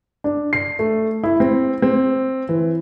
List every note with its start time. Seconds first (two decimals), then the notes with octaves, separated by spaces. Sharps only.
0.24 D4
0.53 C7
0.79 A3
1.24 E4
1.40 C4
1.82 C4
2.49 E3